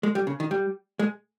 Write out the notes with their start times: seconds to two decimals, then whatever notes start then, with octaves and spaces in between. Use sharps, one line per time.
0.03 G#3
0.15 G3
0.27 C#3
0.40 D#3
0.51 G3
0.99 G#3